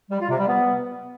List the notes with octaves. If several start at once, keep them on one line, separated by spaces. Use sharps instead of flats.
G3
F4
C3
G3
B3